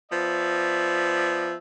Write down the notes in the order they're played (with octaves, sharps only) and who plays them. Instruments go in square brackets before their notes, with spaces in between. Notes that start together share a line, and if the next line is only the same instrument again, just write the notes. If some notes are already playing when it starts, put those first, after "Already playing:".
[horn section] F3 B3 D5 E5